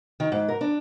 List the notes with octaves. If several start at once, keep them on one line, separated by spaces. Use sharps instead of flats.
D#3
G#2
A#4
D4